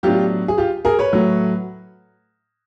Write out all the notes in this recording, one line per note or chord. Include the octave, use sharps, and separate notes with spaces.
A2 F#3 B3 D4 F4 G4
G#4
F4 G4
G#4 A#4
B4 C#5
A2 F#3 A3